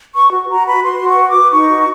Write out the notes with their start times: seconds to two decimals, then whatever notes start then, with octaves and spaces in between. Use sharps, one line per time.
0.15 B4 C#6
0.32 F#4
0.49 F#4 A#5
0.66 B4 B5
0.83 F#4 C6
1.00 F#4
1.06 C#6
1.17 B4
1.28 D6
1.35 B4
1.52 D#4 C#6
1.69 F#4